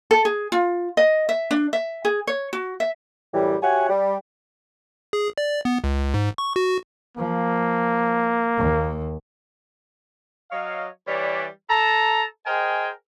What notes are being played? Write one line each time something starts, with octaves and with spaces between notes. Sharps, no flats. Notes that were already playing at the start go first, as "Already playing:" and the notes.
A4
G#4
F4
D#5
E5
D4
E5
G#4
C#5
F#4
E5
F#2 A2 E3 G3
F#4 G4 C#5 E5 F#5 G#5
G3
G#4
D5
B3
C#2
G#2
C#6
F#4
F3 A#3
D#2
F#3 C#5 D#5 F5
E3 G3 B4 C#5 D5
A4 A5 A#5
G#4 A#4 C5 D#5 G5 G#5